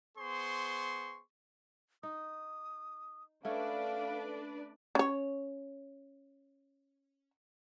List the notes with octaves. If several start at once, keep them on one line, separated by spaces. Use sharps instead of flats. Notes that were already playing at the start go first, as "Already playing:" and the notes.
B3 G#4 C5 C6 C#6
D#4 D#6
A3 C#4 D4 A4 B4 D5 F5
C#4 C#5